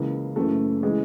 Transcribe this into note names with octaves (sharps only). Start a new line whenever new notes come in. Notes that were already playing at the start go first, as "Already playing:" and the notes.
Already playing: C#2 C#3 E3 A#3
F#1 F#2 C#3 E3 A3
C#3 E3 G#3